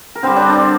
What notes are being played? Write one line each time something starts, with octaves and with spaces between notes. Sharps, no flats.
A#4
D3 G3 C4 C5
D4 D5
D4 D5